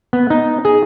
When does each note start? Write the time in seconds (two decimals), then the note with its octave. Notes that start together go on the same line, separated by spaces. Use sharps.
0.13 B3
0.30 D#4
0.65 G#4